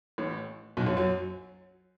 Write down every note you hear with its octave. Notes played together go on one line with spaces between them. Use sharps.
A1 A2
B1 B2
F#2 F#3
F#2 F#3